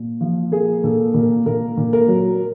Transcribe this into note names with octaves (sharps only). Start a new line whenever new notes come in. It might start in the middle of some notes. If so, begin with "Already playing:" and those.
Already playing: A#2
F3
A#3 G#4
A#2 A4
A#2 A#4
A#2 A#4
A#2
A#4
F#3